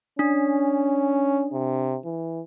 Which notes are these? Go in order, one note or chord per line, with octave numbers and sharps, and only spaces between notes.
C#4 D4
C3
E3